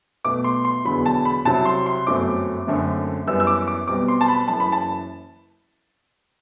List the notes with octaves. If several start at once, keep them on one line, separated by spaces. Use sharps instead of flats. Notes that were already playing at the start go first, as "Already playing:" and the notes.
B1 B2 A3 D6
C6
C6
E1 E2 D3 F#3 B5
A5
B5
C2 C3 F#3 C4 A5
C6
C6
G1 F#2 F#3 A3 C4 D6
F#1 F#2 D3 A3 C4
F#2 E3 G3 B3 E6
E6
D6
D6
B1 B2 G3 C4 D6
C6
A5
B5
F#1 F#2 E3 A5
B5
A5